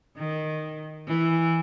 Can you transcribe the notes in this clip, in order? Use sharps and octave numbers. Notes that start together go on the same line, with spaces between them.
D#3
E3